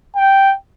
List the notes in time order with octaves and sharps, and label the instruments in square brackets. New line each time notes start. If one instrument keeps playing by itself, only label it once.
[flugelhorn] G5